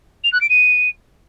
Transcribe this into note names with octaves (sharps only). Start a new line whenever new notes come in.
F7
F#6
D7
D#7